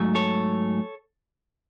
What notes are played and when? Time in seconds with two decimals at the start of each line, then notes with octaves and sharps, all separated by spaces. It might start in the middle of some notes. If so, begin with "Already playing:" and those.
Already playing: G#2 F#3 A3
0.15 A4 C#5